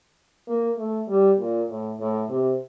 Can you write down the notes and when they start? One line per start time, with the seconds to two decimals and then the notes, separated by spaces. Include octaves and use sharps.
0.48 A#3
0.78 A3
1.09 G3
1.39 A#2
1.70 A2
2.00 A2
2.30 C3